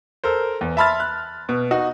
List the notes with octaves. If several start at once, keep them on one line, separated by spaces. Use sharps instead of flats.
A4 A#4 C5
E2
E5 A5 B5 C6 F6 A6
F#6
B2
D#4 F#4